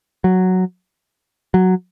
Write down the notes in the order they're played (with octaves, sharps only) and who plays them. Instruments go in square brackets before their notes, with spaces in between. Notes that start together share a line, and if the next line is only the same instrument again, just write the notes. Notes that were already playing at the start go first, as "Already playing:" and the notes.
[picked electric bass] F#3
F#3